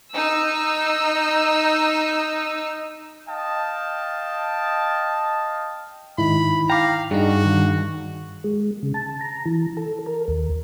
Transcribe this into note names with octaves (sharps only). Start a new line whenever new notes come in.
D#4 E6
D#5 F5 G5 A5
G#2 D#3 D#4 E4 B5
F5 G5 A#5 D6
G2 D4 D#4 F#4 G#4
D#3
G#3
C#3
A5
A#5
E3
A4
A#4
D#2